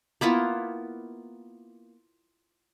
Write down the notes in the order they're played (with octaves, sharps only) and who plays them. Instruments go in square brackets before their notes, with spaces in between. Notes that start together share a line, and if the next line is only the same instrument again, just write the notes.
[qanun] A#3 B3 E4 F4